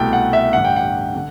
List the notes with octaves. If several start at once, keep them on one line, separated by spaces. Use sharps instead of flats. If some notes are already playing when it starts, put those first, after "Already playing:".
Already playing: C2 B2 A3 E4 G5
F#5
E5
A1 G2 D3 F#5
G5
F#5
D3